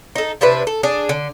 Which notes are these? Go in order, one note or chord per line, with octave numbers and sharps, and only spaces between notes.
D#4 A4
C3 D4 E4 B4
A4
D4 G#4
D3